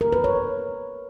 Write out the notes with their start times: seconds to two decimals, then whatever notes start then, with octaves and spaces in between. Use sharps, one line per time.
0.01 A#4
0.12 B4
0.24 C#5